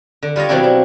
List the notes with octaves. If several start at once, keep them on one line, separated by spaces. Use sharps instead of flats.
D3
G3 F4 C#5 D#5
B2 F3 F#3 C4 D4 E4
D4